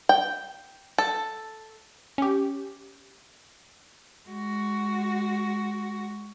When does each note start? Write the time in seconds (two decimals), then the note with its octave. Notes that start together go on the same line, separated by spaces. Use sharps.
0.09 G5
0.98 A4
2.18 C#4 G4
4.28 G#3 F#4